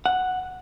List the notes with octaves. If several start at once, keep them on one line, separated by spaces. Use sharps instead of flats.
F#5